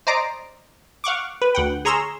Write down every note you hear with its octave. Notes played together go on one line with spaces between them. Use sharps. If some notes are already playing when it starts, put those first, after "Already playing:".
C5 D5 D#5 A#5 D6
F5 F#5 C#6 D6
B4
D2 F#5 G5
G#4 C#5 A#5 C6 E6 F6